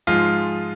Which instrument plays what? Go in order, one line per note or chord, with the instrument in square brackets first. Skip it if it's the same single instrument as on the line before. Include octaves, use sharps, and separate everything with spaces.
[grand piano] G#2 F3 G#3 F4